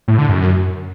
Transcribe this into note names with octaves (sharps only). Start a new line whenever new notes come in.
A2
D3
F#2